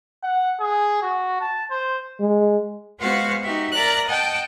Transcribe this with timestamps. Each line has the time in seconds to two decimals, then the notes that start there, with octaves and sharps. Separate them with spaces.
0.23 F#5
0.60 G#4
1.02 F#4
1.41 A5
1.71 C5
2.20 G#3
2.99 G#3 B3 F#4 C5 F5 F#5
3.42 D#4 F#4 G4 E5
3.73 A#4 D5 E5 A#5 F#6
4.08 D#5 F#5 G5 A5